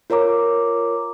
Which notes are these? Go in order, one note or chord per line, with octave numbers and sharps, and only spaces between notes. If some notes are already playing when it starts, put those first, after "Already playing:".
F4 A#4 C#5 A#5 D6